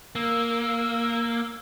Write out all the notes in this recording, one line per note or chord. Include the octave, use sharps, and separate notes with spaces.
A#3 E6